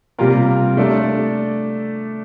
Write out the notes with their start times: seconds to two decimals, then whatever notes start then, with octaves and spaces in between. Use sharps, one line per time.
0.18 C3 G3 A#3 F4 A#4
0.77 A3 D4 A4 D5